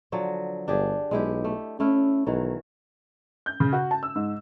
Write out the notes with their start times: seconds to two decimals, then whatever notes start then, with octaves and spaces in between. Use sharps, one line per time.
0.12 D3 F3 F#3
0.68 G1 D4 G4 G#4
1.11 B1 G#3 E4 G4
1.45 A3
1.80 A3 C#4 E4 F5
2.26 B1 D#3 E3 F#3
3.46 G6
3.60 C#3
3.73 F#4
3.91 A5
4.03 E6
4.15 G#2